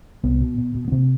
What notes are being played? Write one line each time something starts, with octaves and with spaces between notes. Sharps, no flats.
C2 B3
B2
B2
B2
B3
C3 C4